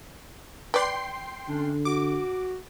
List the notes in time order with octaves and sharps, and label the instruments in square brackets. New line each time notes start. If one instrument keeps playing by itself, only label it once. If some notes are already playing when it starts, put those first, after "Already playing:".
[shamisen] B4 D5 [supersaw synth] G5 C6 C7
[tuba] D3 [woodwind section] A3 C#4 D4
[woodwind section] F#4 [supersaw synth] D6